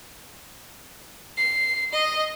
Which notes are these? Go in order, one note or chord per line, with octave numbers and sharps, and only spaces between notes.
C7
D#5